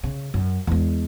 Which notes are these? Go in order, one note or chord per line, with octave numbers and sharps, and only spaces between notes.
C#3
F#2
E2 G#3